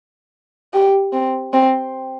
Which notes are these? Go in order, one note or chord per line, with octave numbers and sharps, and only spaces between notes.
G4
C4
C4